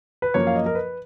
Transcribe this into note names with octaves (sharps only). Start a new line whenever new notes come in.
B4
F#2 F3 A#3 C#5
F5
D#5
A#4
B4